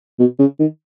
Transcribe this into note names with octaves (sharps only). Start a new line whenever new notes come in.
B2
C#3
D#3